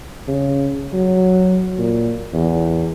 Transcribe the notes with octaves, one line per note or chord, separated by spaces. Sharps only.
C#3
F#3
A#2
E2